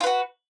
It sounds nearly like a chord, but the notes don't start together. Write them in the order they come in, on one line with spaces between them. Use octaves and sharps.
F4 B4 F#4